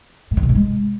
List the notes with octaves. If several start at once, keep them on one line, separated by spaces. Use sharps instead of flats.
A2
D#3
B2
G#2
G#3